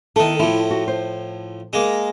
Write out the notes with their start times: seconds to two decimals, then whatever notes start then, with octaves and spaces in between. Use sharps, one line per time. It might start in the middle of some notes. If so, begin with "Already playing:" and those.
0.16 D#3 A3 B3 E4 A4
0.40 A2 F3 E4
0.70 F#4
0.88 C5
1.73 G#3 A#3